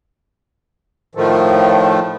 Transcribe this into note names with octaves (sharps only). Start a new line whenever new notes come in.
A2 D#3 F3 A3